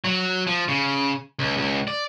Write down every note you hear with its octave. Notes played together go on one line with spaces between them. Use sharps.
F#3
F3
C#3
C#2
C#2
D5